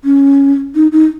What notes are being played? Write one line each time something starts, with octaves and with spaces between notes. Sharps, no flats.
C#4
D#4
D#4